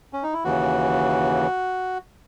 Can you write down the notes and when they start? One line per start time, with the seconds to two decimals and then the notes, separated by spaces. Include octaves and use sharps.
0.13 C#4
0.23 D#4
0.33 E4
0.44 D#2 C#3 E3 F#4